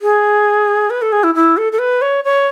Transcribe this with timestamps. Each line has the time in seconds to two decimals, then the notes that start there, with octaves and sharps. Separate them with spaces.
0.02 G#4
0.90 B4
1.02 A4
1.12 G#4
1.24 E4
1.35 E4
1.57 A4
1.72 A4
1.79 B4
2.02 C#5
2.24 C#5